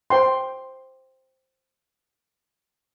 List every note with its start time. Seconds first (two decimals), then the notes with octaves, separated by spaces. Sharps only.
0.10 C5 G5 C6